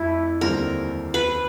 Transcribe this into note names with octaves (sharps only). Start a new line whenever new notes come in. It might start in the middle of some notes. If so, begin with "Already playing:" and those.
Already playing: F2 A3 E4
D#2 D3 G3 C4 A#4
B4